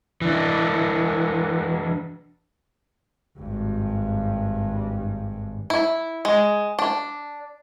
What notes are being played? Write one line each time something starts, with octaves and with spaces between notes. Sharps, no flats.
E3 D4
G#1 G2
E4
G#3
D4